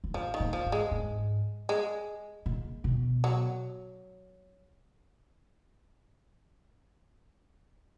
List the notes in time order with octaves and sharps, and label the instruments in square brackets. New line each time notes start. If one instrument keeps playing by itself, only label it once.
[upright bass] F#2
[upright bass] G#2 [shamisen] F3
[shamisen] D#3
[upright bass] A#2
[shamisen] F3
[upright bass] G#2
[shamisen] G#3
[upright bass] G#2
[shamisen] G#3
[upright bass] A#2
B2
[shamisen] F#3